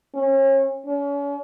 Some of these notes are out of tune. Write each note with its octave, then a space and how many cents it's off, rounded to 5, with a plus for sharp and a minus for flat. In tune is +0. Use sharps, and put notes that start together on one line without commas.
C#4 -35
C#4 +40